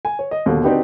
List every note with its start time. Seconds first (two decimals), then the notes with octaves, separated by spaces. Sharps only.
0.05 G#5
0.19 C#5
0.31 D#5
0.46 D#2 B2 D3
0.64 C4 D4 D#4 F#4 G4 B4